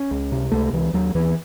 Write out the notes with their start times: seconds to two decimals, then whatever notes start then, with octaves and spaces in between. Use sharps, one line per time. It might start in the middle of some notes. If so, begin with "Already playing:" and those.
Already playing: C#4
0.11 C#2
0.32 C3
0.52 C#2 A3
0.73 C#2 E3
0.93 D#2 F#3
1.15 D#2 E3